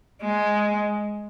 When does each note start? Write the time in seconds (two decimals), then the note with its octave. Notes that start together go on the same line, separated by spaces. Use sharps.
0.22 G#3